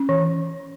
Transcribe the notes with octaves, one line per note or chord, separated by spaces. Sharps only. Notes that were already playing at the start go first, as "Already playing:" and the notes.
Already playing: C#4
E3